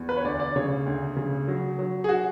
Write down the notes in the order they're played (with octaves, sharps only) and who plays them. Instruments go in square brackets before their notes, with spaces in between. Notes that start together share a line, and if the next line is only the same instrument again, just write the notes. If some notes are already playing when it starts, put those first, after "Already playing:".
Already playing: [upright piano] E2
B4
C#5
D2 D5
D5
C#3 C#5
D2
C#3
F#3
F#3
G#4
F#4